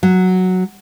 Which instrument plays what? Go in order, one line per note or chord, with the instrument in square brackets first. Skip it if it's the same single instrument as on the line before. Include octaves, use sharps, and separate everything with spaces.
[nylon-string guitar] F#3